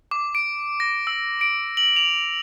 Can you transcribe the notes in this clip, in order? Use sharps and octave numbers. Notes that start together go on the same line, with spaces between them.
D6
D7
A#6
E6
D7
F#7
F7